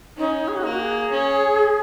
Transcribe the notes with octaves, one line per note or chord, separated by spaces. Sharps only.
C#4 D#4
G#4
F#4
A#3 D#4
F#4
G#4
C#4